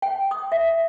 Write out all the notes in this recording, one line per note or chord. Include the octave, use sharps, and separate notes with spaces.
G5
D#6
E5